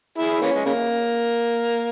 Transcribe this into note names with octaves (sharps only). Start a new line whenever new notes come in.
E4 G#4
E3 A#3 C#4
G#3
C#3 A#3